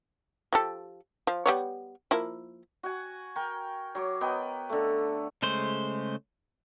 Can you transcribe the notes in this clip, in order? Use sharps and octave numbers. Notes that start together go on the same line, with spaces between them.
F3 G4 A4
F3
G3 B3 C#5
F3 A#3 E4
F#4 F#5 G#5
A#4 G5 C#6
F#3 C#5 D6
B3 A#4 D#5 G5
D3 A3
C#3 G#3 A3 C5